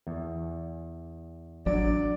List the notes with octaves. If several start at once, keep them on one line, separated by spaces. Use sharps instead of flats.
E2
A1 F#3 C#4 D4 D5